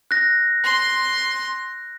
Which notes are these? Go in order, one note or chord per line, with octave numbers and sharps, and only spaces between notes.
F#6 A#6
C6